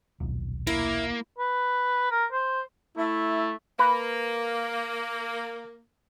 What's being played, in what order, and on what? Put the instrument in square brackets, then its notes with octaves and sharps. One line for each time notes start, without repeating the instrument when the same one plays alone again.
[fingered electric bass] D#1 B1
[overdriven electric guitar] A#3 [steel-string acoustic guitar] E4
[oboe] B4
A#4
C5
[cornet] A3 [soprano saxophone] E4
[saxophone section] A#3 [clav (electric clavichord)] B4